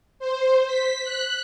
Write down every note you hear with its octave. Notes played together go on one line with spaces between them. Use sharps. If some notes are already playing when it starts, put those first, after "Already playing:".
C5
B6
F#6